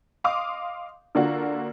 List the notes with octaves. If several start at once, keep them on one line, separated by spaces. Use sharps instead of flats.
D#5 F5 C6 D6 D#6
D3 A#3 D4 F4 F#4